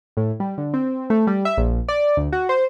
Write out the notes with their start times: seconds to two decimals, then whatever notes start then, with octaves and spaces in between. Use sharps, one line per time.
0.17 A2
0.40 G3
0.58 D3
0.74 C4
1.10 A3
1.27 G3
1.45 E5
1.58 A#1
1.88 D5
2.17 D2
2.33 F#4
2.49 C5